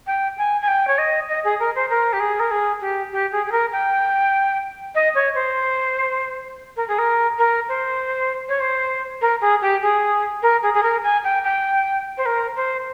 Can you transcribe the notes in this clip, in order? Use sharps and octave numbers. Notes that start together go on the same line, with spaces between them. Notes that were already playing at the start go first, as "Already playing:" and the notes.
G5
G#5
G#5
G5
C#5
D#5
D#5
G#4
A#4
C5
A#4
G4
G#4
A#4
G#4
G4
G4
G#4
G#4
A#4
G5
D#5
C#5
C5
A#4
G#4
A#4
A#4
C5
C#5
C5
A#4
G#4
G4
G#4
A#4
G#4
G#4
A#4
G#5
G5
G5
C5
A#4
C5